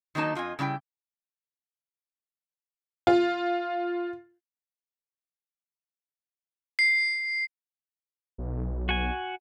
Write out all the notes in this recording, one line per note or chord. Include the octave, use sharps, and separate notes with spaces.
D#3 F#3 A#3 D#4 A5
F2 F4 D#5 G#5
C#3 G3 E4 G5
F4
C7
B1
F#4 G#5